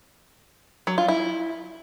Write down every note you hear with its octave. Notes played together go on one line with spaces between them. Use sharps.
F#3
F4
E4